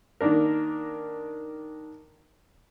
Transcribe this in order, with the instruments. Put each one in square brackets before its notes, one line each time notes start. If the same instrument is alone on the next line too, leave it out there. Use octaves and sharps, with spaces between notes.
[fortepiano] D#3 A#3 D4 A#4